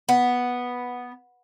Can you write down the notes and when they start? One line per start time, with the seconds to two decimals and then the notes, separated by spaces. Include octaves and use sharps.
0.09 B3